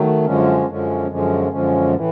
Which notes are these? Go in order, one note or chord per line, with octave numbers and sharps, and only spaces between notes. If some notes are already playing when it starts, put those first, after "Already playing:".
Already playing: D#3 F#3 A3
F#2 D3 F3 G#3 C#4
F#2 D3 F3 G#3 C#4
F#2 D3 F3 G#3 C#4
F#2 D3 F3 G#3 C#4
A2 E3